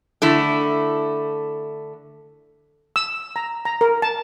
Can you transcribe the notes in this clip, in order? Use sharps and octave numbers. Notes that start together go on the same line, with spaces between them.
D3 A3 E4
E6
A#5
A#5
A#4
A5